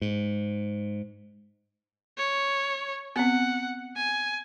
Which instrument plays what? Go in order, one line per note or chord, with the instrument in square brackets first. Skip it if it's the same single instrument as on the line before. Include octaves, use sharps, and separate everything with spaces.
[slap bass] G#2
[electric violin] C#5
[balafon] B3 C4 [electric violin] F#5
[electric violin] G#5